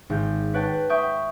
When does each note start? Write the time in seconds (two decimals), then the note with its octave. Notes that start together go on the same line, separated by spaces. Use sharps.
0.10 G#1 G6
0.54 B4 C#5 F#5 G5 A5
0.89 E5 G5 C#6 D#6 G6